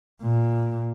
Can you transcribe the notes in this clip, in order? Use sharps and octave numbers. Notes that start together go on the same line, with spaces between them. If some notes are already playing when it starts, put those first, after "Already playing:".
A#2